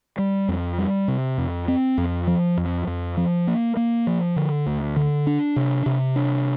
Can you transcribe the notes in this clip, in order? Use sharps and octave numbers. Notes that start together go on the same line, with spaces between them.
G3
F2
G3
C3
F2
C4
F2
F3
F2
F2
F3
A#3
A#3
F3
D3
D2
D3
D4
C3
C3
D4